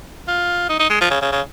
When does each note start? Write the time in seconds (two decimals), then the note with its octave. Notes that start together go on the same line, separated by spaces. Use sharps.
0.28 F4
0.69 D#4
0.79 D#4
0.90 G#3
1.01 F3
1.10 C#3
1.21 C#3
1.32 C#3